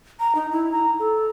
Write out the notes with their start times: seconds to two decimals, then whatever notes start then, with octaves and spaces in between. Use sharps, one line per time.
0.20 A#5
0.35 D#4
0.52 E4
0.72 A#5
0.99 A4